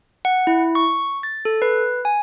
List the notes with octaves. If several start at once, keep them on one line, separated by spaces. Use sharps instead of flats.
F#5
E4
C#6
A6
A4
B4
G#5